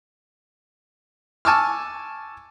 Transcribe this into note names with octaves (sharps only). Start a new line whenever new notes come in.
G#5 A5 C#6 D6 E6 F6